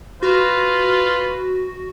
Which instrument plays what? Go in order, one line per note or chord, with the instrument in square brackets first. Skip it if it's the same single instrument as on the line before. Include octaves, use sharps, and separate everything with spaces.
[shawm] F4 [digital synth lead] F#4 [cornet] B4